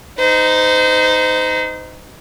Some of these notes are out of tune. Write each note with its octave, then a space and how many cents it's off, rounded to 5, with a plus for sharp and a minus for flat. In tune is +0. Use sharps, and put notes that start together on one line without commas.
D#4 +0 C5 -35